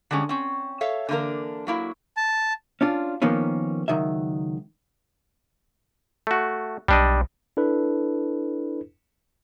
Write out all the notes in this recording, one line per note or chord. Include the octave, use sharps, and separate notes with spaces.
D3 G3 G#3 C#4
C4 C#4
A4 C#5 E5 F5
D3 E3 A#3 D4 A#4
F#3 A#3 E4
A5
C#4 D4 F4
D#3 F3 A#3 B3 C#4
C#2 D#3 F#3 E5
A3 F#4
B1 G3 D4 D#5
D4 E4 A4 B4